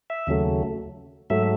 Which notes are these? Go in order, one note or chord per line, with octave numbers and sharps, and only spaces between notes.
E5
D#2 C#3 F#3 A3
G#2 F#3 A3 E5